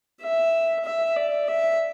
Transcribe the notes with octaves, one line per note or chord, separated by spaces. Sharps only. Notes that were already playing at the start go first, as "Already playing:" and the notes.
E5
E5
D5
E5